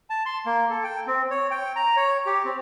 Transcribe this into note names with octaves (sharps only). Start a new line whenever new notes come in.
A5
C6
A#3
A4
G5
C4
C#5
G5
A#5
C#5
G4
C4